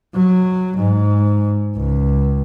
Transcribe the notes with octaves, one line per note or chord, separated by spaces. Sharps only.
F#3
G#2
C#2